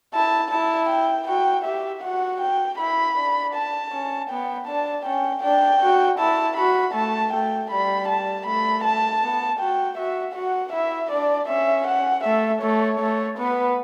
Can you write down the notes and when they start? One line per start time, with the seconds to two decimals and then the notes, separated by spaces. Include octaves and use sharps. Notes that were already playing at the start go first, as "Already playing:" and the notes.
0.14 E4 A5
0.51 E4 A5
0.89 G5
1.28 F#4 G5
1.65 G4 E5
2.03 F#4 F#5
2.41 G5
2.79 E4 B5
3.17 D4
3.54 A5
3.92 C#4
4.30 B3 G5
4.68 D4 A5
5.06 C#4 G5
5.43 D4 G5
5.81 F#4
6.19 E4 A5
6.57 F#4 B5
6.94 A3 A5
7.32 A3 G5
7.71 G3 B5
8.09 A5
8.46 A3 B5
8.84 A5
9.22 B3
9.60 F#4 G5
9.97 F#4 E5
10.35 F#4 F#5
10.73 E4 E5
11.11 D4 D5
11.48 C#4 E5
11.87 F#5
12.24 A3 E5
12.62 A3 C#5
13.00 A3
13.38 B3 B4